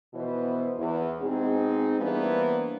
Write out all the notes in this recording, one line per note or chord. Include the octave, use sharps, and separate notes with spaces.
F2 B2 E3 B3 E4 C5
E2
B2 G#3 C4 D#4 G#4
E3 G3 A#3 B3 D4 C5